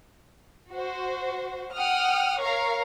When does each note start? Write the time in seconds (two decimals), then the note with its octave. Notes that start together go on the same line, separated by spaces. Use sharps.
0.72 F#4 C5
1.76 F#5 G5 D#6 F6
2.39 A#4 C#5 F5 A#5 C#6